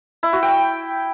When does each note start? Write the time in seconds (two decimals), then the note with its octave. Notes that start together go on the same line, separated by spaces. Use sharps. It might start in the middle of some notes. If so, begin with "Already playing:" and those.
0.23 E4
0.33 F#4
0.43 G5